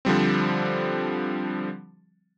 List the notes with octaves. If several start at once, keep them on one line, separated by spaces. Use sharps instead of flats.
D3 F3 G3 C4